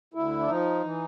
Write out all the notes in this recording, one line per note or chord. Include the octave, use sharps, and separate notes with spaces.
D2 E4
D4
F3 D#4
E3